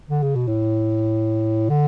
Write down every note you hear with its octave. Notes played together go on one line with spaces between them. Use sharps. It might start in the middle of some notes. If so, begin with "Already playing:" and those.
D3
C#3
B2
A2
D3